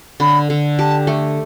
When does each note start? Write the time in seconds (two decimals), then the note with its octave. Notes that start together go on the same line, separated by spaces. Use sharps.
0.20 D3 B5
0.50 D3
0.79 G4 A5
1.07 A3